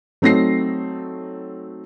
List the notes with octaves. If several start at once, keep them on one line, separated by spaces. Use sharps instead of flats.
F#3 A3 C4 D#4 A#6 C7